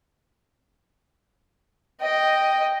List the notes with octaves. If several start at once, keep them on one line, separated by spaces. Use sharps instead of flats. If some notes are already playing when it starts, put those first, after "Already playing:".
D#5 G5